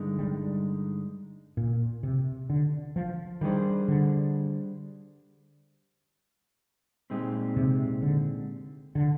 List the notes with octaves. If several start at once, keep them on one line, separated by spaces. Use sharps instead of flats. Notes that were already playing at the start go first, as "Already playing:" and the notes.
Already playing: G2 D3 G#3 D#4
G3
A#2
C3
D3
F3
D#3 G3 D4 G#4 C5
D3
A#2 G#3 C4 D#4 G4
C3
D3
D3